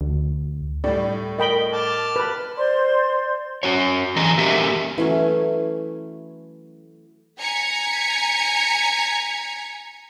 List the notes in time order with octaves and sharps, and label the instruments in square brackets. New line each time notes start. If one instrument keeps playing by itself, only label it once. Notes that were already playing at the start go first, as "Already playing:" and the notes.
[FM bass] D2
[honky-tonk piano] A2 G3 [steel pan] D5
[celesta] A#4 G7 [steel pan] D#5 G5 B5
[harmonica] A5 D6 F6
[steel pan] B4 B5
[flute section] C5 D5 C6
[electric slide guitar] C#4 F#4 C#5
E3 F#3 G#4 D#5 A#5
A3 A#3 C#4 G4 A#4 E5
[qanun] E3 F#3 A3 C#4
[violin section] G#5 A#5 G#6 B6 C#7